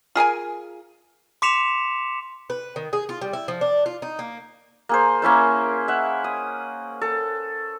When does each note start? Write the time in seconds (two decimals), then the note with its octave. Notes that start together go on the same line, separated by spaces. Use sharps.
0.15 F4 G#4 A#4 G#5
1.42 C6 D6 B6 C#7 E7 F7
2.50 B4
2.76 D#3
2.93 G#4
3.09 F4
3.21 G3
3.33 E4
3.48 F3
3.61 D4
3.86 F4
4.02 D#4
4.19 A#3
4.89 A#3 G#4 C5
5.22 A#3 C#4 E4 C5
5.88 E5 F#5
6.24 D#6
7.01 A4